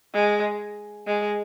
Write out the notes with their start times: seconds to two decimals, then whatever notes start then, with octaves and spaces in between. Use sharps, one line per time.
0.13 G#3
1.07 G#3